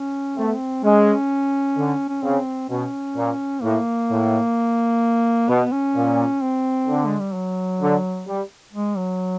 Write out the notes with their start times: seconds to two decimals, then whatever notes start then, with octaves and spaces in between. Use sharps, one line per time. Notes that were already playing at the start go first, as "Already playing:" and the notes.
Already playing: C#4
0.37 A3 C4
0.47 B3
0.55 C4
0.84 G#3 C#4
1.77 D3
2.09 C#4
2.22 C#3 C4
2.69 B2 C#4
3.15 A#2
3.62 A2 A#3
4.09 A2
5.48 B2 B3
5.72 C#4
5.95 A#2
6.41 C4
6.87 D3
7.06 G#3
7.20 G3
7.34 F#3
7.81 D3
8.26 G3
8.73 G#3
8.97 F#3